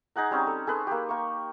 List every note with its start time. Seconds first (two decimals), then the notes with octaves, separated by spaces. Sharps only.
0.16 D#4 G#4 F#5 A#5
0.31 G3 C4 C#4 D#4
0.47 A4
0.67 G#4 A4 B4 C6
0.87 A#3 G4
1.09 A#3 C#6